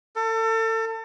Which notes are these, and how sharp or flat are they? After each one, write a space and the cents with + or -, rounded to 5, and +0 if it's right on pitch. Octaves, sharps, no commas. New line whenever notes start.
A4 +35